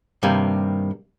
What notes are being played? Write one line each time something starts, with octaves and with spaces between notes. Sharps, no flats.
G2 C3 D#3 G3 A#3